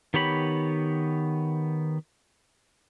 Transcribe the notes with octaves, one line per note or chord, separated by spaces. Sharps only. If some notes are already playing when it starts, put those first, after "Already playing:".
D#3 B3 G4 C#5 B5